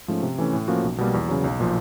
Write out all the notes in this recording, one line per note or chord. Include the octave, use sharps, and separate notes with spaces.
G#2 F3 A3 C#4
C3
E3 A3 C#4
A2
F3 A#3 C#4 F#4
B1
B2 G3 A#3
E2
C#3 F#3
B1
A#2 F3